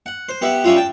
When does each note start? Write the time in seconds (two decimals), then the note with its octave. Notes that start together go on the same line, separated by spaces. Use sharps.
0.06 F#5
0.29 C5
0.42 B3 G4 E5 F#5
0.64 G3 C#4 E4 F4
0.76 G5 A5